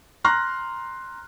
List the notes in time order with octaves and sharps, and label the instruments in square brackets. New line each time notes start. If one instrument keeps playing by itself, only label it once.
[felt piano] A#5 C6 F6 F#6 A#6